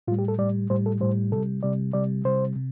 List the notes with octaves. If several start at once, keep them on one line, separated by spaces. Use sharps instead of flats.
A2 G3 F4
G4
A4
A2 G3 D5
A2 G3 C5
A4
A2 G3 C5
C3 G3 A4
C3 G3 D5
C3 G3 D5
C3 G3 C5
C3